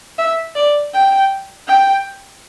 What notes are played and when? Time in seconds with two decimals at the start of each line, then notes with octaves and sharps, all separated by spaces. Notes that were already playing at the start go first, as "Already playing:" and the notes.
0.18 E5
0.55 D5
0.94 G5
1.67 G5